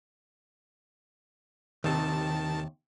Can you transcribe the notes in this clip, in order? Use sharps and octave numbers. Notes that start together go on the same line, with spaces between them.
D#2 C3 D#3 A5